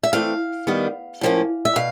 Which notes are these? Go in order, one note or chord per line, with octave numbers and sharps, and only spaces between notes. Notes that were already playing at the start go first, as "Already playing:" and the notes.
E5
E3 A3 C4 F5
D#3 G3 B3
A2 F3 A#3 C#4
E5
B2 F5